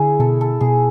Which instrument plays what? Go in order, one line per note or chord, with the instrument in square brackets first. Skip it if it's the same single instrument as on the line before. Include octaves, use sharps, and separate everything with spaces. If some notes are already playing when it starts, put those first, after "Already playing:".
Already playing: [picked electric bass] D3 [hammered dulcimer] E4 G#4
[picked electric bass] B2 [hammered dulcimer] A4
[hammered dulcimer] A4
[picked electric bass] B2 [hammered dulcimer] G#4